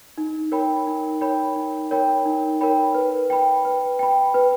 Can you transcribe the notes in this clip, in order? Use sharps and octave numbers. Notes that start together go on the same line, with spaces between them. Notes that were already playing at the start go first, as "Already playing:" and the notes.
D#4
A#4 C#5 G5 B5
D#4
A#4 C#5 G5 B5
D#4
A#4 C#5 G5 B5
D#4
A#4 C#5 G5 B5
B4
G5 B5
B4
G5 B5
B4